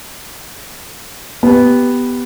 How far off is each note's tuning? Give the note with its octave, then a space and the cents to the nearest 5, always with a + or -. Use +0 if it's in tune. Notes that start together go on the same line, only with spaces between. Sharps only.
B3 +0 G4 +0